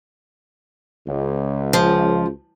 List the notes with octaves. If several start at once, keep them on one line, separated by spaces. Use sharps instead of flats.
C#2
F3